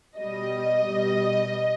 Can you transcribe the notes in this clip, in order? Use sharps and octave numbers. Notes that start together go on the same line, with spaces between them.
B2 G3 D#5
B2 G3